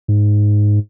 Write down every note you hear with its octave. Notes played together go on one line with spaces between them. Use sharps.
G#2